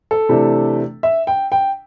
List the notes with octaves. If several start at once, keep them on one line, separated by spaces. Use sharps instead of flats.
A4
C3 E3 A3 D4
E5
G5
G5